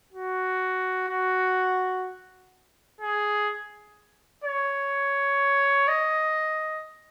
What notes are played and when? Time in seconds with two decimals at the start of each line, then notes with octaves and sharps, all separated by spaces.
0.13 F#4
1.09 F#4
3.00 G#4
4.44 C#5
5.88 D#5